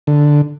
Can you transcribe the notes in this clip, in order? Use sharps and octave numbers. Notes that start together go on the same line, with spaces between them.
D3